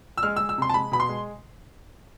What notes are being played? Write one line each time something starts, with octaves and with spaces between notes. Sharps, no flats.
E6
G#3 F6
G#3 E6
E6
C3 C6
A5
G#3 B5
B2 B5
C6
G#3